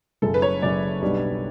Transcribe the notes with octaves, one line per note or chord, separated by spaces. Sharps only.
F#1 F#2 C#3 A4
B4
C#5
F#1 F#2 C#3 D5
B1 B2 G3 D4